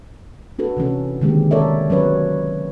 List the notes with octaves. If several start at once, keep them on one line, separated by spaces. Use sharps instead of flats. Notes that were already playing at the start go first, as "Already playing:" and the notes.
D4 F#4 A4 B4
C3 E3 C#4 A4
D3 D#3 G#3 A#3 C4 G4
A4 A#4 C#5 D5 E5
F#3 C#4 B4 C#5